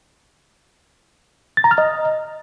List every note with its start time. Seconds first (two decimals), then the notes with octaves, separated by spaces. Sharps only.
1.57 A6
1.64 A#5
1.71 F6
1.78 D#5